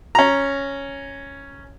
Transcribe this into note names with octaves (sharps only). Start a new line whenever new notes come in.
C#4 A#5